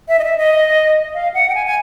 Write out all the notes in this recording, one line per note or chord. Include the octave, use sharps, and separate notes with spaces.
E5
D#5
E5
D#5
F5
F#5
G5
G#5
G#5